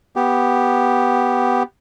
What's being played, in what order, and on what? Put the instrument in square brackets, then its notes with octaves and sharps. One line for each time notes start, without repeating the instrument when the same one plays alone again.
[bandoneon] B3 G4